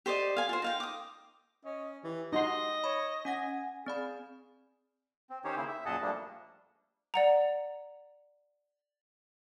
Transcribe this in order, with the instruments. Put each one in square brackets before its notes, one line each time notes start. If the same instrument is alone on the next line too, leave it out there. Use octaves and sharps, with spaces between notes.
[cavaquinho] G4 C5 D5 D#5
F5 G#5
F4 C5
D#4 F5 G5
D6 D#6
[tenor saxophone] C#4 [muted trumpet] D#5
[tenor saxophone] E3 [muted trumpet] G4
[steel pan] D#4 F#4 C6 [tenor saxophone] D#5
[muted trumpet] C#5 [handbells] B5
[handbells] C#4 F#5 A#6 [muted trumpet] G#5
[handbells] C4 D5 B5 [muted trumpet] G#4
[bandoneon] C4
D#3 C#4 D#4 G4 C5 C#5
C#3 A#3 E4 C5
E5
F#2 A#2 G#4 D#5 F#5 A5
F3 G3 A3 A#3 D4
[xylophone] D5 F#5 A#5